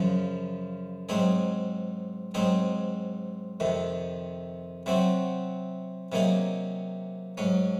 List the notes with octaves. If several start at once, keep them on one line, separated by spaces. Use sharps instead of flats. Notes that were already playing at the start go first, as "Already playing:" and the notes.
Already playing: F#2 C#3 F3
G#2 F#3 C4 D#4 G#4
G#2 F#3 C4 D#4 G#4
F2 C3 D#3
C3 F#3 C4 F#4
C3 F#3 A#3 D#4 G#4
G#2 F#3 C#4